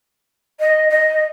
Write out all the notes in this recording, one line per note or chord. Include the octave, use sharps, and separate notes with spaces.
D#5
D#5